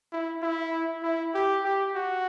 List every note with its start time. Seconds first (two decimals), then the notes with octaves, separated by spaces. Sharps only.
0.13 E4
0.43 E4
1.03 E4
1.34 G4
1.64 G4
1.96 F#4